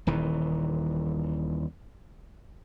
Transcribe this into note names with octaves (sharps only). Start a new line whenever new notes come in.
D#1 D#3 E3